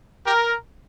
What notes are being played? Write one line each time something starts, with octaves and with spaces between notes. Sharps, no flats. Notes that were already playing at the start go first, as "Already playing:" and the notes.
G4 A#4